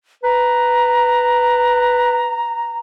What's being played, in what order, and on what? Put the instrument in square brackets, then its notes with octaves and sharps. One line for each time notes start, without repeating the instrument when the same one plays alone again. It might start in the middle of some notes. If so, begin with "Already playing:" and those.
[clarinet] B4 [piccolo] A#5